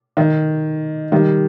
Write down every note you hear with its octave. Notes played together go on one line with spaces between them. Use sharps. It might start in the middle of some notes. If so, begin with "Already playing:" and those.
D#3
D#3 G3